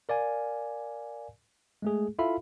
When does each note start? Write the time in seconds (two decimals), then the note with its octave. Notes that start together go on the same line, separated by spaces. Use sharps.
0.09 A#4 D5 F5 G#5
1.82 G#3 A3 G#4
2.19 E4 F4 A4 E5 F5 B5